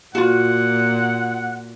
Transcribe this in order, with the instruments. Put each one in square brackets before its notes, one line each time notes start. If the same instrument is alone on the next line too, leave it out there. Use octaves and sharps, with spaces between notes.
[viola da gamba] A#2 [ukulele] F4 F#4 [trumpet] F#5